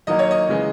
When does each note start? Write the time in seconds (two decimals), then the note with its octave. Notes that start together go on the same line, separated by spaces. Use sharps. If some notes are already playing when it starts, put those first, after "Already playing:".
0.07 D#3 F#3 A#3 D#4 D#5
0.19 C#5
0.31 D#5
0.49 C#3 E3 G#3